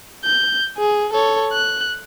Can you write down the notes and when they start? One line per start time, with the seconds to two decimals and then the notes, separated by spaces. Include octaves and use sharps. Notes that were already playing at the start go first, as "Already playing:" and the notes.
0.25 G6
0.78 G#4
1.13 A4 C#5
1.53 F#6